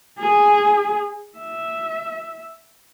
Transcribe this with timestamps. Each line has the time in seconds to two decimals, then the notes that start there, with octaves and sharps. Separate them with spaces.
0.19 G#4
1.38 E5